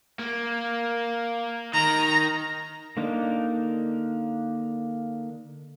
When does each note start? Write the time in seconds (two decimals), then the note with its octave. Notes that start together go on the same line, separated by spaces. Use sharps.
0.19 A#3
1.73 D#3 A#5
2.97 D3 A#3 D4 D#4